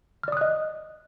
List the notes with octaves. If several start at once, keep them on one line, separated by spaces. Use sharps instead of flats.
D5 D#5 D#6 F6 F#6